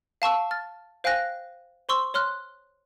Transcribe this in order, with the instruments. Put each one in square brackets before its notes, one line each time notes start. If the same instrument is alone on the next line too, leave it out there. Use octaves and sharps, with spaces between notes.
[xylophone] F5 A5 C#6 E6
F6 A6
C5 F5 G5 G#5 F#6 A#6
C5 C6 C#6 E6
C#5 C6 F6 F#6